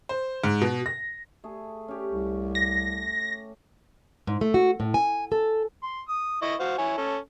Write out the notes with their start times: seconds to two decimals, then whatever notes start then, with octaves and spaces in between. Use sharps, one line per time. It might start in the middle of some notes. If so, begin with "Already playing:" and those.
0.09 C5
0.44 G#2
0.62 B2
0.86 A#6
1.44 A3 G#4
1.88 C#4 G4
2.12 C2
2.55 A#6
4.27 G#2
4.41 A3
4.54 F#4
4.80 A2
4.94 G#5
5.32 A4
5.83 C6
6.09 D#6
6.42 E4 D#5 C#6
6.60 F#4 C5 F5
6.78 E4 C#5 G#5
6.97 C#4 A4